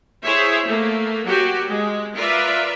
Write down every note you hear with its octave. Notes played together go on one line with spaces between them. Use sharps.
E4 G#4 C5 C#5 E5
A3 A#3
F#3 F#4 G4
G#3
F4 A#4 B4 D5 E5